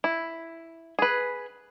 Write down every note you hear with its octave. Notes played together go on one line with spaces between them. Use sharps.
E4
G#4 B4